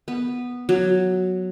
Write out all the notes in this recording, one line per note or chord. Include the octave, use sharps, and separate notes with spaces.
B3
F#3